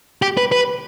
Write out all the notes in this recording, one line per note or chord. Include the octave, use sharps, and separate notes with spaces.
G4
B4
B4